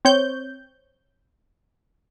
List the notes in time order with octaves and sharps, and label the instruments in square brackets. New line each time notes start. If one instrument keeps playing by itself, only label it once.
[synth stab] C4 C#5 G6